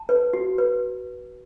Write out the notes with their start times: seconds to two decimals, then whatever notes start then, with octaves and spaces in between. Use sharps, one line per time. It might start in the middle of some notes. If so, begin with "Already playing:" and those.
Already playing: A5
0.09 B4
0.33 F#4
0.58 B4